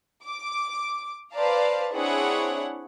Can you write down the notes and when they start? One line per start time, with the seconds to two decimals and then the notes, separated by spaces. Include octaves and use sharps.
0.25 D6
1.34 B4 C5 D5 F5 A5 A#5
1.94 C4 D4 E4 G#4 C#5 F#5